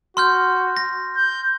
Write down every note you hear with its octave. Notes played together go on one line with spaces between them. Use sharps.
F#4 C6 F6 G6
A#6
G6